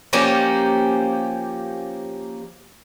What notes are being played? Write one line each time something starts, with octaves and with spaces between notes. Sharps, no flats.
F3 A#3 C#4 G4